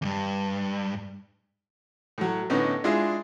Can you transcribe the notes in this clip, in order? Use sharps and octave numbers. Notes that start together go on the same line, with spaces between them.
E2 G2
A2 F#3
A2 D3 B3 C#4 D#4
G#3 D4 E4 F4 G#4